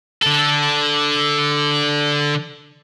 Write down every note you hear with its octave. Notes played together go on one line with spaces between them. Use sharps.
D3 A4